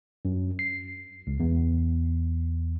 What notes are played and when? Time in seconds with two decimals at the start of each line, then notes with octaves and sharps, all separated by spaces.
0.25 F#2
0.59 C7
1.27 C#2
1.40 E2